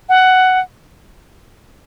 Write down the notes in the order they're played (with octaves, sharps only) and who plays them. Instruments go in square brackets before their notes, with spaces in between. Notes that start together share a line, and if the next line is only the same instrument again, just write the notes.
[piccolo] F#5